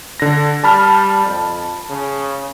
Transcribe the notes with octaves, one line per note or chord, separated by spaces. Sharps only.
D3 A#6
G3 A5 B5 F6
F2
C#3